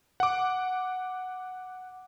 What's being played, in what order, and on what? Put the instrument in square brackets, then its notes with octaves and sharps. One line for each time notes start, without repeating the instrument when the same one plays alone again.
[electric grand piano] F#5 D6